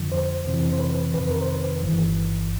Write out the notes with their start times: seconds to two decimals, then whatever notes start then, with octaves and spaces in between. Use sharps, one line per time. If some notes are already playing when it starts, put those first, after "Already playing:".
Already playing: F2 D3 F3
0.12 C5
0.46 F2 C3 E3
0.72 C5
0.80 B4
1.14 F2 C3 D#3 B4
1.31 A#4
1.41 C5
1.48 B4
1.83 G1 G2 E3